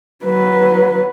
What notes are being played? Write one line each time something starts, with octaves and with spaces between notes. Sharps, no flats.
F#3 B4